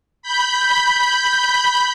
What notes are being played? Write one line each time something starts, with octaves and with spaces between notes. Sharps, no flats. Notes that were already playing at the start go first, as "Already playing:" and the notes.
B5 G6